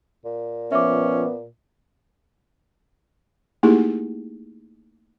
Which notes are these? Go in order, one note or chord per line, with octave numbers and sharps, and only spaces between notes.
A#2
F3 B3 C#4 E5 D6
A3 A#3 D#4 E4 G4 G#4